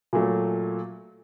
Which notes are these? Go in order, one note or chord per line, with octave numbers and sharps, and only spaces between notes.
A#2 F#3 A3